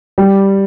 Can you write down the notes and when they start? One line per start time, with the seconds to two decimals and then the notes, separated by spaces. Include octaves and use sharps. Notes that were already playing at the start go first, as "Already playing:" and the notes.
0.18 G3